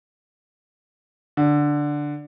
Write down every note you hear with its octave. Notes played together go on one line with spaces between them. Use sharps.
D3